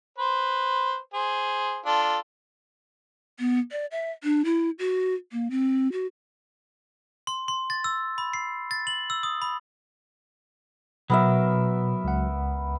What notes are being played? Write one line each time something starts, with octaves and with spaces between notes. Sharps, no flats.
B4 C5
G#4 C5
D4 F4 A4
B3
D5
E5
D4
E4
F#4
A#3
C4
F#4
C6
C6
A6
E6
B5
C7
A6
F#7
E6
D#6
B5
B2 F#3 B3 A#4 E5
C#2 F#5